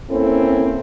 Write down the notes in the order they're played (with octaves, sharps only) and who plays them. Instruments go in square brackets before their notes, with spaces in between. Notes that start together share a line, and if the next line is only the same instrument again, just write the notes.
[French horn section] A#3 C4 C#4 E4 A4